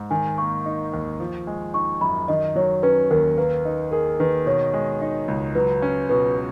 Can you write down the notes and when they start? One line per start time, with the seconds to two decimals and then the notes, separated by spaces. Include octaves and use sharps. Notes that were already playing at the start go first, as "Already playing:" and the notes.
Already playing: G#2
0.10 D#3 G#5
0.38 A#3 C#6
0.66 D#4
0.93 D#2
1.20 F3
1.47 G#3
1.74 D#4 C#6
2.01 F#2 B5
2.28 D#3 D#5
2.56 F#3 C#5
2.83 C#4 B4
3.11 D#2 A#4
3.38 A#3 B4
3.65 D#4
3.92 G#4 A#4
4.20 D#3 B4
4.46 B2 C#5
4.73 G#3
5.02 D#4
5.28 C#2
5.55 F#3 B4
5.82 C#4
6.09 B2 B4